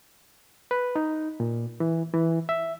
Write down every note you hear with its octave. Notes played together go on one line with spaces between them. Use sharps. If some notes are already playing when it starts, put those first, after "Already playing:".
B4
D#4
A#2
E3
E3
E5